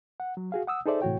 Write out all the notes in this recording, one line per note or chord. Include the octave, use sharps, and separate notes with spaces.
F#5
F#3
F#4 G#4 F5
F#5 D#6 E6
D#4 G#4 A4 C5 D5 E5
A2 C3 E3 F#4 C#5 G5